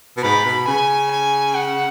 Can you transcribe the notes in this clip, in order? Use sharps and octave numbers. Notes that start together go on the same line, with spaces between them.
B2
G#2 B5
B2
C#3 G#5
G#5
F#5